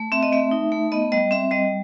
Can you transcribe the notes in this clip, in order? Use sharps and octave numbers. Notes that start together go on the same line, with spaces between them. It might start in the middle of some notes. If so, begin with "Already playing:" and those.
Already playing: A3
C4 E5
D#5
A3 E5
D#4
A3
B3 D#5
G3 D#5
C4 E5
G3 D#5